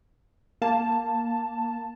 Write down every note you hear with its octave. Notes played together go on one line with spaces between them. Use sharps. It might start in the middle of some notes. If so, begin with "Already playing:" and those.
A#3 A5